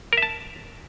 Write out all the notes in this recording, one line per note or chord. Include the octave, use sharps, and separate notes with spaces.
A#4 E5 A5